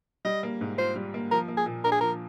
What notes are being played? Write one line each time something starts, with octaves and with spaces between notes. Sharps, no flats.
G3 D#5
A#3
G#2
F4 C5
G3
A#3
F3 A#4
A#3
G#4
A#2
D4 A#4
G#4
F3 A#4